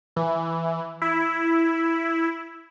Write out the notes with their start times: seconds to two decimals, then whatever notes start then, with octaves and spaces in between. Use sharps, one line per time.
0.16 E3
1.02 E4